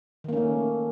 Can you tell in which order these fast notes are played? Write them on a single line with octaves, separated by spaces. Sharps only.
D#3 A#3 C#4 A3